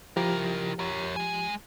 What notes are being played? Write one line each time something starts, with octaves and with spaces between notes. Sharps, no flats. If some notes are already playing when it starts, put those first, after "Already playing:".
F3 E4 G4 A#4
A#4 C#5
G#3 G#5